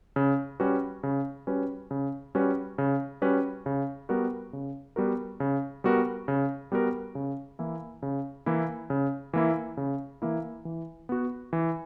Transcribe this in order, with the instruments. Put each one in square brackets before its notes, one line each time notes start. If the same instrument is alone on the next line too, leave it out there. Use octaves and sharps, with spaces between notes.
[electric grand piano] C#3
G3 C#4 F#4 B4
C#3
G3 C#4 F#4 B4
C#3
G3 C#4 F#4 B4
C#3
G3 C#4 F#4 B4
C#3
G3 B3 F#4 A#4
C#3
G3 B3 F#4 A#4
C#3
G3 B3 F#4 A#4
C#3
G3 B3 F#4 A#4
C#3
E3 A#3 E4
C#3
E3 A#3 E4
C#3
E3 A#3 E4
C#3
E3 A#3 E4
E3
B3 F#4
E3